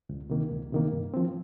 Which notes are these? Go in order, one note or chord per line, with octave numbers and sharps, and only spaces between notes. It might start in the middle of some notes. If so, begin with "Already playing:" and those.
C#2
C3 D#3 A#3
C#2
C3 D#3 A#3
G2
F3 C4